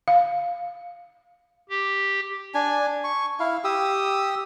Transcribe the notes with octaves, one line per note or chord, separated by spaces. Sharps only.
F5
G4
D4 G#5
C#6
E4 F5
G4 D#6 E6